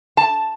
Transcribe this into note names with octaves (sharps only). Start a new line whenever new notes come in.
A5